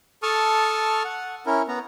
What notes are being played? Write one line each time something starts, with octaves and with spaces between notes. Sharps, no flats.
A4 A5 C#6 D#6 F6
F#5
C#4 E4 A#4
B3 A#5